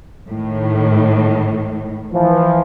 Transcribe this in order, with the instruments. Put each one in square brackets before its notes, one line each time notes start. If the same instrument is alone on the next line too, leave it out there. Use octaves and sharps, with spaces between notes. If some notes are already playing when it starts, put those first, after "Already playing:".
[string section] A2 D#3
[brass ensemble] E3 F3